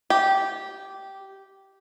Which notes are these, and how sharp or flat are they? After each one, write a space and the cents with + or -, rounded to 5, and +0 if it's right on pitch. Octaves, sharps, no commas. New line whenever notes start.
G4 -10